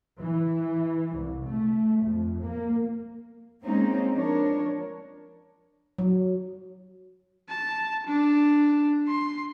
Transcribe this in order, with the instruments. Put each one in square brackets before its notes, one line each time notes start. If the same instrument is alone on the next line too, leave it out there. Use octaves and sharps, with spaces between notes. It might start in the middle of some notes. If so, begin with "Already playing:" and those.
[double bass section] E3
C2
A3
F2
A#3
[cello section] G#3 A#3 C4 C#4 D#4
F3 D4 A#4 C#5
[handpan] F#3
[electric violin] A5
D4
C6